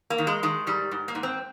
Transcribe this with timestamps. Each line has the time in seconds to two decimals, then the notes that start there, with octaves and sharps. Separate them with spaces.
0.10 A#3
0.18 D#3
0.27 G#3
0.43 D#3 G#3
0.67 G#2 G3
0.91 G#2
1.08 A#3
1.15 G#2
1.23 C4